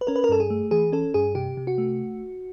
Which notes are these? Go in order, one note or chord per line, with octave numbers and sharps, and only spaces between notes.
B4
C#4 A#4
B4
A#4
G2 A4
G#4
A3
E3 G#4
C#4 A4
G2 G#4
C3 G4
C3
F#4
A3